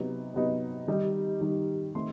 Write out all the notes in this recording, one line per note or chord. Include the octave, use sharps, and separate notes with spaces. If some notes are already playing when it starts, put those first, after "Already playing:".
Already playing: C3 F#3 B3 D#4
C3 F#3 B3 D#4
D#3 G3 D#4
D#3 G3 D#4
D#3 A3 C4 C6